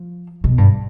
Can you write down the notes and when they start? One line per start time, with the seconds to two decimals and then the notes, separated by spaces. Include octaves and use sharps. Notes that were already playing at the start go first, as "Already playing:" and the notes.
Already playing: F3
0.44 B2
0.58 G2